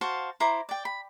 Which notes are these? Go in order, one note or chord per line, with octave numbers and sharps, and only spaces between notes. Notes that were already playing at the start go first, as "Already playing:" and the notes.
F#4 C5 F5 A5
E4 C5 A#5 D6
D5 G5
B5